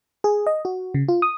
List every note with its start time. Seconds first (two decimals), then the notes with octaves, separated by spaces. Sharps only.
0.24 G#4
0.47 D#5
0.65 F#4
0.94 C#3
1.08 F4
1.22 D#6